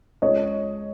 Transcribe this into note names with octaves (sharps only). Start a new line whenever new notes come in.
C#2 C#5 D#5